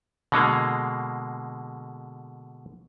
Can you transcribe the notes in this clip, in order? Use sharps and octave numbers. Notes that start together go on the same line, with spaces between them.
B2 D3 G#3 A#3